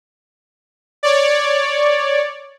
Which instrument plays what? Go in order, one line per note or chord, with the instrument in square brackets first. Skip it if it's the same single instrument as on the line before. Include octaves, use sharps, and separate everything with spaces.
[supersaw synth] C#5 D5